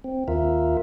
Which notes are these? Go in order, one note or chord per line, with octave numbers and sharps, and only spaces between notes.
C4
D#2 F4 A#4 E5